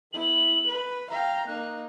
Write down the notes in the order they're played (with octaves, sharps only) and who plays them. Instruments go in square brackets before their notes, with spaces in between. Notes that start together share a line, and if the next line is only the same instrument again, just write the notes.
[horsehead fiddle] B3 E4 [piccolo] F#7
[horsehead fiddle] B4
[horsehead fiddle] F5 G5 [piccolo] A#5
[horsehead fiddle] A#3 D#4 [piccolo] F#6